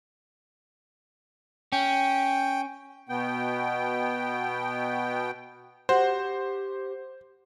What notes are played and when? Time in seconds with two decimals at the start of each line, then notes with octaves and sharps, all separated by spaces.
1.72 C#4 G5
3.09 B2 B3 G5
5.89 F#4 G4 C5